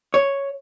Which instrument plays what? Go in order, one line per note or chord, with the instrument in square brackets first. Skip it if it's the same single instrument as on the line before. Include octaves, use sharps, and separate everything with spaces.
[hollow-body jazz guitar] C#5